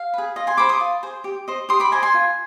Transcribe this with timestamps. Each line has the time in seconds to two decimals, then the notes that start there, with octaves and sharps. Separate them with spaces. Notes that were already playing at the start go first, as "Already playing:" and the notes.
Already playing: F5
0.14 G#4 B4
0.36 F4 D#5
0.47 G#5 C6
0.57 G#4 C5 B5 D6
0.69 C6 D#6
0.80 F4
1.03 G#4 C5
1.24 G4
1.48 C5 D#5
1.69 G4 C6 D#6
1.80 B5 D6
1.91 C5 D#5 G#5 C6
2.03 G#5 C6
2.14 F4